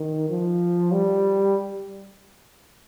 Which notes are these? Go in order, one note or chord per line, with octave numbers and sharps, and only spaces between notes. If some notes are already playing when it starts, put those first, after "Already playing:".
Already playing: D#3
F3
G3